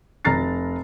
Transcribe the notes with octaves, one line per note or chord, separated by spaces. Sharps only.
F1 A#5 F6 A6 C7